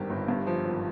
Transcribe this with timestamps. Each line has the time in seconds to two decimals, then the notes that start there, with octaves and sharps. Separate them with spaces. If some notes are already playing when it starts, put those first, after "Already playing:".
Already playing: G#1 G2 G3 G4 A#4
0.10 G1
0.28 G2
0.47 F3
0.64 G#1